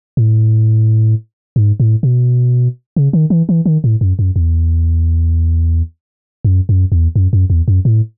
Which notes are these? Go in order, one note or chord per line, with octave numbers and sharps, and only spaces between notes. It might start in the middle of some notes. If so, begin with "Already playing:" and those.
A2
G#2
A2
B2
C#3
D#3
E3
E3
D#3
A2
F#2
F#2
E2
F#2
F#2
E2
F#2
F#2
E2
F#2
A2